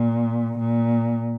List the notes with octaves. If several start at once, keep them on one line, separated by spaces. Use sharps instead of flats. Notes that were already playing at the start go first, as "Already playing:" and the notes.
Already playing: A#2
A#2